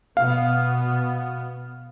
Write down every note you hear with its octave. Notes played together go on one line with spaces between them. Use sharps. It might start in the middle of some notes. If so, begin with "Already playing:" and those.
B2 B3 F5